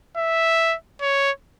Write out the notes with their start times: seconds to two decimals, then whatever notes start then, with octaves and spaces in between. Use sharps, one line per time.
0.17 E5
1.02 C#5